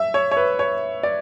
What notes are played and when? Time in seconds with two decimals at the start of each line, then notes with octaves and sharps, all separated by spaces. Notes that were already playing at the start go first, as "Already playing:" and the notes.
Already playing: E5
0.14 C#5
0.31 C#5
0.37 B4
0.59 C#5
1.03 D5